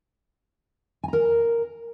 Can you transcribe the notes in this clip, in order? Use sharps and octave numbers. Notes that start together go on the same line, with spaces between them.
A#4 G#5 A#5